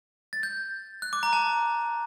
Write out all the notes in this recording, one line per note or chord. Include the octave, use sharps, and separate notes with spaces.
A6
G6
F#6
D6
A#5
A5